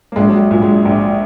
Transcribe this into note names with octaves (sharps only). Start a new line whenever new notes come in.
A#3
A#1 G#3
F#3
G#3
A#2
G#3
A#1